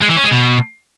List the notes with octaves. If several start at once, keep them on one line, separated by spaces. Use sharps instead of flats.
G#3
E3
C#4
G#3
B2